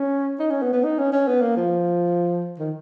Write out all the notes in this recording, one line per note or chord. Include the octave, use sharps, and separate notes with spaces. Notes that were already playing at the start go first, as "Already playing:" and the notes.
Already playing: C#4
D#4
C#4
B3
B3
D#4
C#4
C#4
B3
A#3
F3
D#3